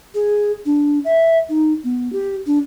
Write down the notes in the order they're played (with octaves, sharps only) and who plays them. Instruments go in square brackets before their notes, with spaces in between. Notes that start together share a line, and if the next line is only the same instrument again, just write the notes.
[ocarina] G#4
D4
E5
D#4
B3
G4
D4